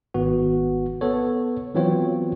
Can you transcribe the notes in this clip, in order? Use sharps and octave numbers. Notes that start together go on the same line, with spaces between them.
G#1 B3 F#4
B3 A4 C#5
E3 F#3 B3 C4 F4 C#5